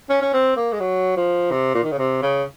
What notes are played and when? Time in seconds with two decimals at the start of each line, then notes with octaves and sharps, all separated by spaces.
0.10 C#4
0.22 C#4
0.34 C4
0.57 A#3
0.72 G#3
0.80 F#3
1.16 F3
1.51 C3
1.74 A#2
1.83 D#3
1.91 C#3
1.98 C3
2.22 C#3